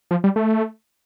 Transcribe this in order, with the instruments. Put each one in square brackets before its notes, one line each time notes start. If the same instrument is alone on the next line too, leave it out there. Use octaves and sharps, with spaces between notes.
[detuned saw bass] F3
G3
A3